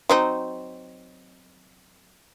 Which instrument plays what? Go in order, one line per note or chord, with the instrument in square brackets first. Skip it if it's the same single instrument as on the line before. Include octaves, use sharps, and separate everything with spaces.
[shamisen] F#3 C4 D#4